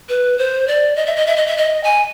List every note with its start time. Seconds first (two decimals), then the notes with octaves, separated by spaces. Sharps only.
0.09 B4
0.38 C5
0.68 D5
0.96 D#5
1.06 E5
1.16 D#5
1.27 E5
1.36 D#5
1.47 E5
1.57 D#5
1.84 G#5